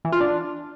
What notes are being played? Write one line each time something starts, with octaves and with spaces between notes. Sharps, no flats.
E3
F4
D4